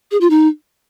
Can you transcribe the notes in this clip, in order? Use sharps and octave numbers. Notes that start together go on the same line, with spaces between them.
G#4
F4
D#4